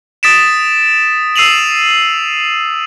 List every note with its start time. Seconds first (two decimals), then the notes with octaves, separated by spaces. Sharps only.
0.23 D#6 A6 B6 D7 E7
1.36 E6 C7 D#7 F7 F#7